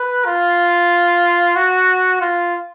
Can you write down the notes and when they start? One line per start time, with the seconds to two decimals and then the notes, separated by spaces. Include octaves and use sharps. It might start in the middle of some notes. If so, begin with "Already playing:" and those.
Already playing: B4
0.26 F4
1.56 F#4
2.21 F4